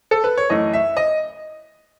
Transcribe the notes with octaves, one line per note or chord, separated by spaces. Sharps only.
A4
B4
C#5
F#2 E3 A3 D#5
E5
D#5